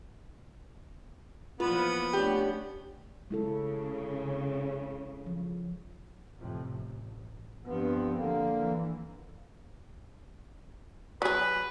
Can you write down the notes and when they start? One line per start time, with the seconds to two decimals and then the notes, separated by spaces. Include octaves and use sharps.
1.60 A#2 E3 F3 B3 F4 B4
2.13 A3 C#4 D4 G4
3.30 C#3 G#3 E4 A4
5.26 F3
6.39 F2 A2 C3
6.69 A1
7.66 G2 F3 B3 C4
8.16 D3 A#3
8.59 E3
11.22 F#3 G#4 B4